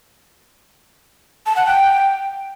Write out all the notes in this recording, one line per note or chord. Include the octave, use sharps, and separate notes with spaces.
A5
F#5
G5